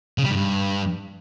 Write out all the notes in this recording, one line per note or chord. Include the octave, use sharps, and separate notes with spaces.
C#3
G3
G#2
G2